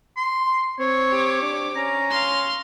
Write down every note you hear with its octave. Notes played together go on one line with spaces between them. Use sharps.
C6
C4 C#5
G4 D6
D4
C#4 A#5
F5 C6